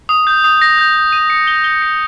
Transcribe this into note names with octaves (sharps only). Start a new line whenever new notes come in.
D#6
G6
D#6
A#6
G6
G6
D#7
C#7
G7
G7
C#7